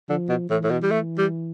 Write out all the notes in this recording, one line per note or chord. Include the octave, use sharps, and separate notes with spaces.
D3 F3
B2
A2 E3
A2
B2
G3
A3
G3